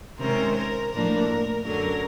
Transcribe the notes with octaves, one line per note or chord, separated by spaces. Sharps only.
C3 D#3 G#3 C#4 A#4 C5
A#4
A2 F3 A#3 D4 A#4
F#2 D3 F#3 A#4